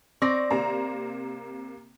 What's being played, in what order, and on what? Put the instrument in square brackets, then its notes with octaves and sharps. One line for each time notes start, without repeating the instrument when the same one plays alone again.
[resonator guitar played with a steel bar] C4 D5 [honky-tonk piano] C#6 A#6
[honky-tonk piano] C3 A#3 A#5